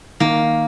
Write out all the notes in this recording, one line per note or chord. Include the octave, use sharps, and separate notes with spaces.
D#3 A#3